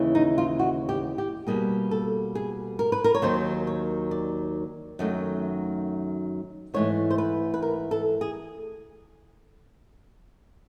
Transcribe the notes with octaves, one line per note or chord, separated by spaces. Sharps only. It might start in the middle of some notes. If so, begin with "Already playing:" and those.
Already playing: D#2 C#3 E3
D#4
F4
F#4
G4
G4
B2 G3 A#3 G#4
A4
G#4
A#4
B4
A#4
C#5
D#2 D#3 F#3 C5
C#5
D5
F#2 D#3 F#3 A3
G#2 E3 A3 C#5
C5
B4
B4
A#4
A4
G#4